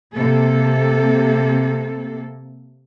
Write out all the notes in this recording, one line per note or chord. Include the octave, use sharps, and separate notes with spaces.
C3 A#3 A4